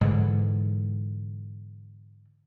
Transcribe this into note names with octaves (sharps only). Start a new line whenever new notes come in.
G#2 D3 E3